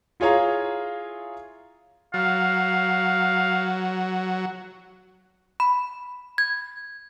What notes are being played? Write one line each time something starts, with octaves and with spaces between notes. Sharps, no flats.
E4 F4 G#4 C#5 F5 A#5
F#3 F5
B5
G#6